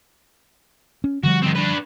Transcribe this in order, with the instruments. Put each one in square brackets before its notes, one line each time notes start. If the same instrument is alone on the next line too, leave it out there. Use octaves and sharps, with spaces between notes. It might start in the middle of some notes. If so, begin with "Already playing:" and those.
[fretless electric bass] C#4
[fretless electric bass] D3 F3 G3 [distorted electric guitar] F#4
[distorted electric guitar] D#3 C4
D4 B4